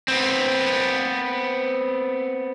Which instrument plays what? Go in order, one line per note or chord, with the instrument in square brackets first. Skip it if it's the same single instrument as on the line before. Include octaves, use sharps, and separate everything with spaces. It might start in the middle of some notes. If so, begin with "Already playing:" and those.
[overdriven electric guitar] B3 C4